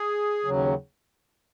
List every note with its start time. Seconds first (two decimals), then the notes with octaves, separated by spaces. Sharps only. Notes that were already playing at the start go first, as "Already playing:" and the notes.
Already playing: G#4
0.45 D#2 C#3 F#3